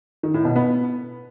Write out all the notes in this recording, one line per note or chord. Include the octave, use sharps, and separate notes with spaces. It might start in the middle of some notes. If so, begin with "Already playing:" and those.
D#3
A2
B2
B3